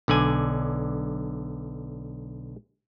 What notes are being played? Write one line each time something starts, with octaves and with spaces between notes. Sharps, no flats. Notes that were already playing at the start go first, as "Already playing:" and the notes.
B1 D3 D5 G#5